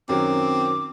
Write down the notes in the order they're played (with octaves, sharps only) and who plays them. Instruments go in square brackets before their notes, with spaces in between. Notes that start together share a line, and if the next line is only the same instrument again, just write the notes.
[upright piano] F#2 D#3 F#3 [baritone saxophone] C4 [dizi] D6